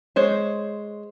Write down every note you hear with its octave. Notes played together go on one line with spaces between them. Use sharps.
G#3 C5 C#5